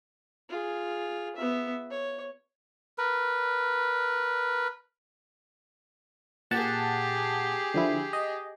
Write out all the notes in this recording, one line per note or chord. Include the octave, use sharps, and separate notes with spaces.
F4 G#4
B3 E5
C#5
A#4 B4
A#2 G4 G#4 F#5 A5
D3 F3 E4
D#5